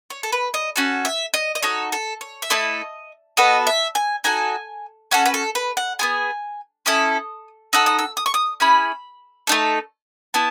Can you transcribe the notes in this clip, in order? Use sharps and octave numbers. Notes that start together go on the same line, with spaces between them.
C#5
A4
B4
D#5
C#4 F#4 A4
E5
D#5
D#5
D#4 F#4 A4 C#5
A4
C#5
E5
A3 E4 A4 D#5
B3 F#4 A4 D#5
E5
G#5
D#4 F#4 A4 G#5
C#4 F#4 A4 F#5
B4
A4
B4
F#5
B3 E4 G#4 G#5
C#4 E4 A4 D#6
D#4 F#4 A4 E6
D#6
E6
D#6
C#6
D#6
C#4 E4 G#4 B5
A3 D#4 A4
B3 E4 A5